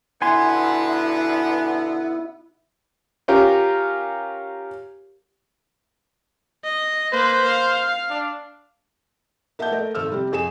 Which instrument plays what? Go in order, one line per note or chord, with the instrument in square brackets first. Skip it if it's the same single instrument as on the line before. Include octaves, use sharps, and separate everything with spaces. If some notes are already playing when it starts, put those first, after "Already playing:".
[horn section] B2 D3 B3 [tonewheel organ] E4 [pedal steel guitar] G#5 C6
[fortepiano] C#4 F4 G4 A#4
[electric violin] D#5
[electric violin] A#3 B4 [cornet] C5
[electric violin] F5
[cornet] D4
[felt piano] A#3 E5 F#5 A5 G6
A3 A#4 D#5
G#1 A4 E6 F6
C3 G3 C4
F2 G#4 G#5 E7